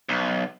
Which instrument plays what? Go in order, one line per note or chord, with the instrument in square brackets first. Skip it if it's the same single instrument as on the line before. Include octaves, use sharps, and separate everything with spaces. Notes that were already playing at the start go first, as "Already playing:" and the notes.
[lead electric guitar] B1